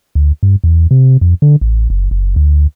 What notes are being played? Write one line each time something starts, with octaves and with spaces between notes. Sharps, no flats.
D2
G2
E2
C3
F2
D3
A1
F#1
F#1
D2